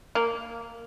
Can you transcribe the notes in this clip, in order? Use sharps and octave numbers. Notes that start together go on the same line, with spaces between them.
A#3